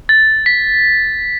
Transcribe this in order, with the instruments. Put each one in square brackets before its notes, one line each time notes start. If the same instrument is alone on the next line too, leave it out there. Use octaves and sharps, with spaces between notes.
[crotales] A6
B6